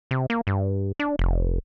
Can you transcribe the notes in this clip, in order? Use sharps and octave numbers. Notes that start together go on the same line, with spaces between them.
C3
A#3
G2
D4
F1